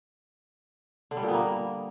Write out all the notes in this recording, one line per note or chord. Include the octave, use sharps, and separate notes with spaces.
D3
G3
A#2
B3
A#3